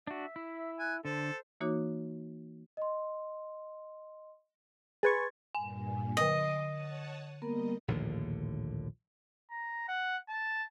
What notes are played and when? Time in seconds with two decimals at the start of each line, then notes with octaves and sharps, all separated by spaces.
0.07 D4 F#4 E5
0.36 E4
0.79 G#5 F#6
1.05 D3 A4 C5
1.60 E3 A#3 D#4 F#4 C#5 D6
2.77 D#5 C6
5.03 G#4 B4 C6 C#6 G#6 A6
5.55 G2 A#2 G#5
6.17 D3 D#5 C6 D6 D#7
6.66 C#5 F#5 A5
7.42 G3 A#3 B3 A#4 D#5
7.88 A#1 D#2 A2 D3
9.51 A#5
9.89 F#5
10.29 A5